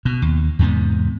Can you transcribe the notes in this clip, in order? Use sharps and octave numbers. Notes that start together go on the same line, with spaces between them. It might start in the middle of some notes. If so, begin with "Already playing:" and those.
B2
D#2
E2 G#2 C3 B3